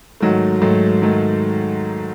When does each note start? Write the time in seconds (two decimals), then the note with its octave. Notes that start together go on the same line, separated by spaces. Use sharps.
0.21 G#2 D#3 F#3 A3
0.61 G#2 D#3 F#3 A3
1.02 D#3 F#3 A3